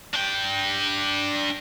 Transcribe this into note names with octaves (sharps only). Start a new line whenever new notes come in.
D4 G5